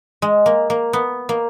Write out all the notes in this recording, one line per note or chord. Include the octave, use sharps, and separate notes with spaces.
G#3
A#3
A#3
B3
A#3